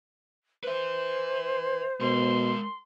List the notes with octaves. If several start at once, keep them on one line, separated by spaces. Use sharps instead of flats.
B4 C5 E5
B2 G#3 A#4 C6